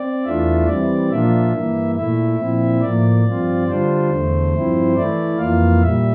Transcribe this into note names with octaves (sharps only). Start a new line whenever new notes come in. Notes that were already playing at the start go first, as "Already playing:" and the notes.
Already playing: C4 D5
E2 E3 A3 D4 F4 E5
E3 G3 C4 D5
A#2 F3 A#3 D4 F4 E5
G2 E3 A#3
A#2 A3 E4 E5
A#2 F3 C4 E4
A2 F3 A#3 D5
G2 F3 C4 F4
D3 G3 D4 F4 C5
E2 D3 A3
G2 F3 C4 E4
E3 A3 E4 D5
F2 E3 A#3 F4 F5
A#2 G3 E5